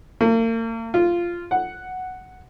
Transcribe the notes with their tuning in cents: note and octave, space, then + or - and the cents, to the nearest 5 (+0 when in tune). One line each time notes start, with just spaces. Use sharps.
A#3 -40
F4 -10
F#5 +0